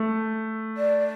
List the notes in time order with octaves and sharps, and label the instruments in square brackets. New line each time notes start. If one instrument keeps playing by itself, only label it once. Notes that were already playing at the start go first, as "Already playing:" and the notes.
Already playing: [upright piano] A3
[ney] D5